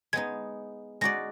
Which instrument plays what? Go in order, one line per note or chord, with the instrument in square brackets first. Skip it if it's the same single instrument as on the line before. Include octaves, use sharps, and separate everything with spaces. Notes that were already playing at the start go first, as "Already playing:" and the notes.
[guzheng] G#3 B3 D#4 [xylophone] G#6
[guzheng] G#3 D#4 F#4 D5 [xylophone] A#6